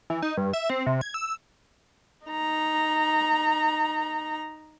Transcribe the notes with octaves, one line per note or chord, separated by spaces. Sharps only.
E3
D#4
G2
E5
C4
C3
G#6
E6
D#4 A#5